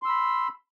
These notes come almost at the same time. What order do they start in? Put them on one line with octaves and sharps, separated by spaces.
C6 E6 B5